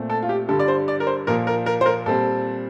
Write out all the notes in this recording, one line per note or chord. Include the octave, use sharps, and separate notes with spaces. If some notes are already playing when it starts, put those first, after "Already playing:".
Already playing: A#2 A3 C4
A4
F4
G4
G2 D3 G3 A4
D5
C5
D5
A#4
C5
A#2 F3 A#3 A#4
A#4
A#4
C5
A#4
A#2 G3 C4 A4